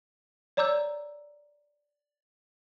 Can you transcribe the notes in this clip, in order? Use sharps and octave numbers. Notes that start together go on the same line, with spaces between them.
C#5 D5 A#5 D6 E6 G6